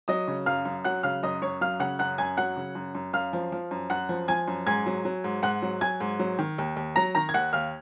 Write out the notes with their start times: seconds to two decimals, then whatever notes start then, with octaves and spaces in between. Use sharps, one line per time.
0.08 F#3 D#5 D#6
0.28 C#3
0.46 F#2 F5 F6
0.65 F#2
0.84 F#3 F#5 F#6
1.03 C#3 F5 F6
1.23 F#2 D#5 D#6
1.42 F#2 C#5 C#6
1.61 F#3 F5 F6
1.80 C#3 F#5 F#6
1.99 F#2 F#5 F#6
2.18 F#2 G#5 G#6
2.37 F#3 F#5 F#6
2.57 C#3
2.75 F#2
2.95 F#2
3.13 F#2 F5 F6
3.33 F3
3.52 F3
3.71 F#2
3.90 F#2 F#5 F#6
4.09 F3
4.28 F3 G#5 G#6
4.48 F#2
4.67 G#2 G#5 G#6
4.86 F#3
5.05 F#3
5.24 G#2
5.43 G#2 F#5 F#6
5.62 F#3
5.81 F#3 G#5 G#6
6.00 G#2
6.19 F#3
6.39 D#3
6.58 D#2
6.76 D#2
6.96 F#3 A#5 A#6
7.15 D#3 A#5 A#6
7.29 G#6
7.34 D#2 F#5 F#6
7.53 D#2 F5 F6